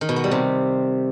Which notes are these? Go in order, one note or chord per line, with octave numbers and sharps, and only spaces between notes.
D#3
B2
B3
G3
C3